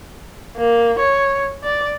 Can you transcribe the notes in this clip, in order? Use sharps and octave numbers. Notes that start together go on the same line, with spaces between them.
A#3
C#5
D5